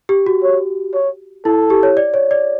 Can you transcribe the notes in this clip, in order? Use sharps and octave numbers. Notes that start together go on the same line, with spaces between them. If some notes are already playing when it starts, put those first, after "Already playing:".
G4
F#4
C#5
C#5
E4 A4
G4
C#5
D5
C#5
D5